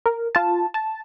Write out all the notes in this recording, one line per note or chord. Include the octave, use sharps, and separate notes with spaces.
A#4
F4 A5
A5